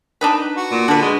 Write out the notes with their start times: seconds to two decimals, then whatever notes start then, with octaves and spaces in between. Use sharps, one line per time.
0.21 D4 D#4 B4
0.57 F#4
0.71 A#2
0.88 D3 D4 B4
1.02 G#3